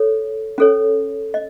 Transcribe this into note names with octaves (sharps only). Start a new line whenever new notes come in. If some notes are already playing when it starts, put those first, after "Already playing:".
Already playing: A4 C#5
C#4 A4 C#5
D#5